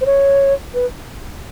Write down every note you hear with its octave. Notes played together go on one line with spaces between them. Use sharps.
C5
C#5
B4